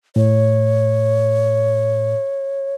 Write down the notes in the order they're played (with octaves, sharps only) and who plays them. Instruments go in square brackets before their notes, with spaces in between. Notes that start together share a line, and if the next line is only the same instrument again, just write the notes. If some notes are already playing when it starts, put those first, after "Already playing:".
[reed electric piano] A2 [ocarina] C#5